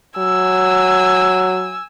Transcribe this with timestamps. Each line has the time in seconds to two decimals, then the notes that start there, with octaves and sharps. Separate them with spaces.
0.18 F#3 G#5 E6